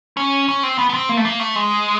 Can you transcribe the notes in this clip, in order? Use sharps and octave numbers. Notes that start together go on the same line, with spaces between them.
C#4
C#4
C4
B3
B3
C4
A#3
A3
A#3
A3
G#3